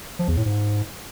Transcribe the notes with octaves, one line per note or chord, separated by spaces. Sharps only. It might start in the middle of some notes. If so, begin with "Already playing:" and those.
F3
E2
A2
G#2